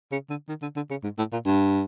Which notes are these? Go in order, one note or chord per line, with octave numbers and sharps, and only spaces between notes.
C#3
D3
D#3
D3
D3
C#3
G#2
A2
A#2
G2